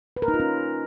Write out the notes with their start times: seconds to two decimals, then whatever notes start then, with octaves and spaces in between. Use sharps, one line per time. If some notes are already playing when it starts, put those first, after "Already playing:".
0.17 B4
0.22 A#4
0.28 D#4
0.34 F4
0.40 C#4